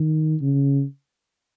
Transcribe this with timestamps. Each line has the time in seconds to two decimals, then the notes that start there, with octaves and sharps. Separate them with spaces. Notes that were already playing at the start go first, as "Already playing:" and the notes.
Already playing: D#3
0.41 C#3